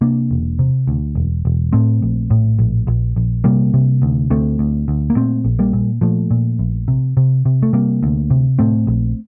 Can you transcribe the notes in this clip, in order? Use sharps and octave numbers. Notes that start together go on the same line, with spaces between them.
C3 A#3 D4
E1
C3
D2
E1
E1
A2 A3 C4
A#1
A2
A#1
A#1
A#1
C3 G3 A#3
C3
D2
D2 A3 C4
D2
D2
A#3
A#2 A3 C4
A#1
G3 A#3
A#2
A#2 F3 A3
A#2
A#1
C3
C3
C3
A3
C3 G3 A#3
D2
C3
A2 A3 C4
A#1